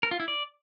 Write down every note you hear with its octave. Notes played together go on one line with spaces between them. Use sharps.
A#4
F4
E4
D5